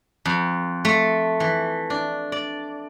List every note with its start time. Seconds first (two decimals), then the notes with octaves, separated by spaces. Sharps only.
0.25 F2
0.85 A3
1.40 E3
1.90 D4
2.32 D5